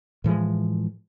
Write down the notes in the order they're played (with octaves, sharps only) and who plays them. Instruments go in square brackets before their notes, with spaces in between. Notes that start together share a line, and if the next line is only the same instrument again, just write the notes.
[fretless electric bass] A2 E3 F3 G#3